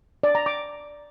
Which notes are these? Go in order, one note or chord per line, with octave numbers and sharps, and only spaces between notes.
D5
A#5
D6